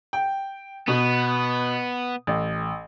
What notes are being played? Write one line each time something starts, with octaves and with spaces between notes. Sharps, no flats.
G5
B2 B3
A1